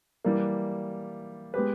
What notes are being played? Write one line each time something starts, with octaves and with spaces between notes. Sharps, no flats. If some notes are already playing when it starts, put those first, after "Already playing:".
E3 G3 A#3
G#3 B3 G4 B4